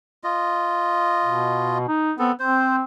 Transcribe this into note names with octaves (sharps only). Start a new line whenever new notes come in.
F4 D#5
B2
D#4
B3 C4 A4
C4 C5